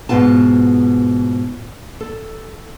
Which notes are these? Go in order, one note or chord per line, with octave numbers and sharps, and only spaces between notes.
G#2 B2 B3 F4 A5
A4